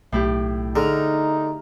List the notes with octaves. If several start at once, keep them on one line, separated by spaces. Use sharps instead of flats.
B1 A2 E4 G4
D3 D#4 G#4 A#5 F6